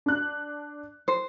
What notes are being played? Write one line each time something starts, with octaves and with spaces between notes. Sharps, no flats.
D4 F#6
C5